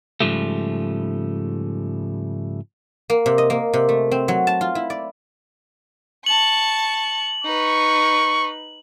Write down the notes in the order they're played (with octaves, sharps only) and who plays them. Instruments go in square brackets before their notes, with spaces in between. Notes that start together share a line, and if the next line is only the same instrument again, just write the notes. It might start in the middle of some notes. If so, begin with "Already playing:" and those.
[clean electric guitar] G#2 C#3 F3 G3 A3
[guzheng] A#3
C3
D#5
A#3
C3
A3
C4
F#3
A5
F4
E4
D5
[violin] A5 C#6 [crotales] F#7
[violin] D#4 B4 [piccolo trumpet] C#6